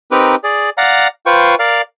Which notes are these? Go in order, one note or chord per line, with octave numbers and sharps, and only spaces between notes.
C4 D#4 G4 A#4 B4
G#4 D5
D5 F5 F#5 A#5
F4 B4 C5 G5 C#6
A#4 D5 F5